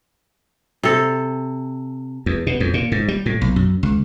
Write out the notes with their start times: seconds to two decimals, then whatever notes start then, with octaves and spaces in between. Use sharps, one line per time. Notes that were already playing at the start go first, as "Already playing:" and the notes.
0.83 C3 A4
2.26 E2
2.47 B2
2.60 F2
2.74 A#2
2.92 G#2
3.08 G3
3.26 A2
3.41 B1
3.56 F#2
3.83 C#2